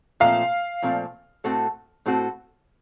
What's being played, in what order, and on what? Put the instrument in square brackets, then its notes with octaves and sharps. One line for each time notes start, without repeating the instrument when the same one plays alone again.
[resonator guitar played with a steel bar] A#2 F3 A3 C4 [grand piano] F5
[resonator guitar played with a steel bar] A#2 F3 A3 C4
A2 A3 C4 F#4 A4
A2 A3 C4 F#4 A4